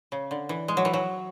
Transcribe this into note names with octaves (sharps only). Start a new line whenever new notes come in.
C#3
D3
E3
G#3
F#3
E3
F#3